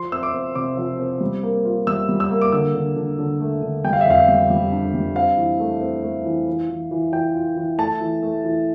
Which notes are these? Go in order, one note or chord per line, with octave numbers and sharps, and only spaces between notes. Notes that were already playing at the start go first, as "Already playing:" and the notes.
Already playing: F3 C6
C4 E6
D6
C4
C3 D6
F3
C4
G3
A#3
F4
G3 E6
G3
E6
A#3
D6
D3 E6
D3
D3
D3
A3
D3
G3 G5
F5
E5
F2 F5
G3
G3
D4
G3
C4 F5
E3
A3
C4
A3
E3
E3
E3
E3
E3 G5
F4
E3
A3 A5
E3
A3
E3